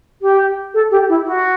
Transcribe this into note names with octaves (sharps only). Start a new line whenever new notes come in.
G4
A4
G4
E4
F#4